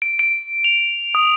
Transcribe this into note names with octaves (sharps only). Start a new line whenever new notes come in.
D7
D7
F7
D#6